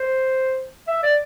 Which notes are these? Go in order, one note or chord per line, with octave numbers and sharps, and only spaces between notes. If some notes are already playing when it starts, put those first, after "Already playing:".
Already playing: C5
E5
D5